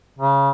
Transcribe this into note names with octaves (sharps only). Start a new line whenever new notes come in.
C#3